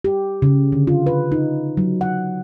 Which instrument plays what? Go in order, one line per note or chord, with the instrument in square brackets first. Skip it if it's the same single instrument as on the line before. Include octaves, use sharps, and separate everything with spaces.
[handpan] G4
C#3
D3
F4
B4
D#4
F#3
F#5